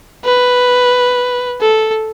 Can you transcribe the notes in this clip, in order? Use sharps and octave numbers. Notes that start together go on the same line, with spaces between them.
B4
A4